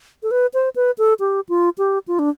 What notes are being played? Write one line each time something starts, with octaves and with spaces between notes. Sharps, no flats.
A4
B4
C5
B4
A4
G4
F4
G4
F4
D4